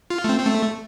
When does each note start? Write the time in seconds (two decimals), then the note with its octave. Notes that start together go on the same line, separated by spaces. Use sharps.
0.10 F4
0.24 A3
0.29 C4
0.39 C4
0.46 A3